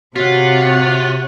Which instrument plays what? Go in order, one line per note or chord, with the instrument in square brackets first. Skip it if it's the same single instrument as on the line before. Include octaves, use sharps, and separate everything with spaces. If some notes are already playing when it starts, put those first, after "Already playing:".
[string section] C3 [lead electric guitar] F4 [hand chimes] F#4 B6 [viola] C#5 F#5